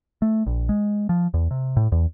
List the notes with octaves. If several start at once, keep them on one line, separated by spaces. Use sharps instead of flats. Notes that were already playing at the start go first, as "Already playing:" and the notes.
A3
A#1
G#3
F3
E2
C3
A2
E2